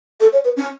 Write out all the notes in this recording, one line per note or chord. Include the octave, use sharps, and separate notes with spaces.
A4
C#5
B4
C#4